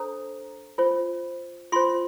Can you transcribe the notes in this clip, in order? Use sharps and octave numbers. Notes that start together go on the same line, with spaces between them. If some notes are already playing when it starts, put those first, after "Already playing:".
Already playing: D4 A4 C5 A#5
F4 C5
F4 C5 C6